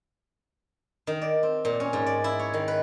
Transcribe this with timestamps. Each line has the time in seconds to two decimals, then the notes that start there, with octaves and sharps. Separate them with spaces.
1.07 D#3
1.21 D5
1.43 C4
1.65 A#2
1.80 C#4
1.93 G#2
2.06 D5
2.24 E4
2.39 C#5
2.54 D#3
2.68 B4